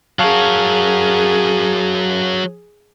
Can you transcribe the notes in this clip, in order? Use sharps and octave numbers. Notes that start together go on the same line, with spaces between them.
F#3 G#4 A#4 F5 A5 C#6